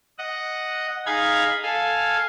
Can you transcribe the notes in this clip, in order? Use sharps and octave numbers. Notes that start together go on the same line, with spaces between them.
D#5 F#5
D#4 G#4 F5 B5 G#6
A4 F5 G#5